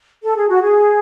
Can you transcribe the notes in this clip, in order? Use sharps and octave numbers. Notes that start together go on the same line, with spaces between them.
A4
G#4
F#4
G#4